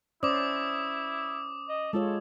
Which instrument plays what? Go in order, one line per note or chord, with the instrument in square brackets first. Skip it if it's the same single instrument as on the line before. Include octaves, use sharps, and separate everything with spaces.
[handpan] C#4 C5 D5 [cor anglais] E4 [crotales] D6 D#6
[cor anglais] D#5
[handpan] G#3 F4 C#5 [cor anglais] A4